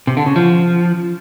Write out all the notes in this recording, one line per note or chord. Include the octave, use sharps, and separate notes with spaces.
C3
D3
C#3
F3